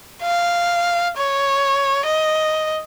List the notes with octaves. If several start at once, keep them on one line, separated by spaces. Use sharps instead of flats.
F5
C#5
D#5